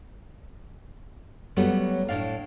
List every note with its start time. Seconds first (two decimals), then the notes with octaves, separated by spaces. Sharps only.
1.56 F#2 F#3 G3 A3 B3
2.09 A2 D4 F5